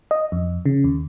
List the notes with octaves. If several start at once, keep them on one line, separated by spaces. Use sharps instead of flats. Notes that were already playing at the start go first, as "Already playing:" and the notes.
D#5
F2
C#3
D#2